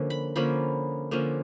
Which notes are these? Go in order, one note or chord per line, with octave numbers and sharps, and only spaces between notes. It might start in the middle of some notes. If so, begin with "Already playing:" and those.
Already playing: D3 F3 A#3 C#4
B5
D3 F3 A#3 C#4 B5
D3 F3 A#3 C#4